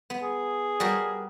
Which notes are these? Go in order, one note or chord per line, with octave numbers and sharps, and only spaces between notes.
B3
G#4
G3 F#4 A#4